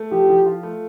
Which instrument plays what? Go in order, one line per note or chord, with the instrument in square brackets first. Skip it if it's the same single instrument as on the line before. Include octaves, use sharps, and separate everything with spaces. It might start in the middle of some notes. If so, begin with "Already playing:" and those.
Already playing: [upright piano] A3
[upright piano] F3 [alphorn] G4
[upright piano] F3
F4
A3